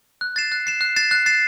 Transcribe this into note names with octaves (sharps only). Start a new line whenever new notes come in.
F#6
A6 C7 E7
F#6
A6 C7 E7
F#6
A6 C7 E7
F#6
A6 C7 E7